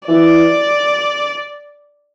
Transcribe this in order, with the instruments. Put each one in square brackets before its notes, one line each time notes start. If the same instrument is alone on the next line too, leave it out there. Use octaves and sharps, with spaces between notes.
[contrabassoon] E3 [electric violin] D5